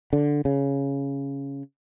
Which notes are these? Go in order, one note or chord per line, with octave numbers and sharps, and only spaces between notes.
D3
C#3